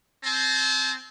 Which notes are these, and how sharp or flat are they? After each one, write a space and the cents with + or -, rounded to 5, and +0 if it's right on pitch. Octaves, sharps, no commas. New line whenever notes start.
C4 +0 A5 -45